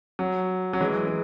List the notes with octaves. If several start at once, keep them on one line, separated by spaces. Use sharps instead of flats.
F#3
F#3
E3 G#3
G#3